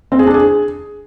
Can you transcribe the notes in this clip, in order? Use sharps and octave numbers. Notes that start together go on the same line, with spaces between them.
C4
G#4
D4
G#4